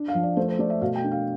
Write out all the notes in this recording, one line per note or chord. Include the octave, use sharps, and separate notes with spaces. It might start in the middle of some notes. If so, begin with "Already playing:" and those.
Already playing: D4
F5
F3
D5
A3 C5
C5
A3 D5
E5
B2 F5
G5
D4
F5